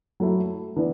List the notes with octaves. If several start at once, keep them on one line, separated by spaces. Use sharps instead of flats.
F#3 A3 E4
E3 B3 D4